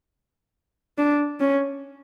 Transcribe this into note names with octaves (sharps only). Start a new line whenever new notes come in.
D4
C#4